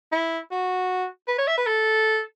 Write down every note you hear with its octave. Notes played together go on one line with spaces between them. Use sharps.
E4
F#4
B4
C#5
E5
B4
A4